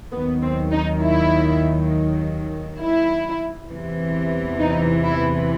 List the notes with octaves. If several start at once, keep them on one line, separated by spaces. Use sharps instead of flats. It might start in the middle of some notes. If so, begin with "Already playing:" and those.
D#2 D#3 F#3 B3
C4
D#4
E4
E4
E2 C3 E3
D#4
E4